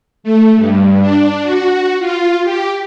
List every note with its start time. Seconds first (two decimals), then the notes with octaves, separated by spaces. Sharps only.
0.24 A3
0.56 G2
1.00 D4
1.43 F#4
1.99 F4
2.43 G4